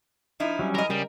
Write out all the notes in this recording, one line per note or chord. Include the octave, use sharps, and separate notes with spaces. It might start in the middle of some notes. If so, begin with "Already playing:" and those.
F3 D#4 E4
F#3 G3 C#4
E3 A#4 D#5
C#3 G3 G#4 A#4